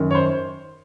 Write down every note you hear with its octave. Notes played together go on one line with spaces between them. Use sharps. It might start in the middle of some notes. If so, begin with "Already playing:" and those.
Already playing: F#2 D#3
C#5
C5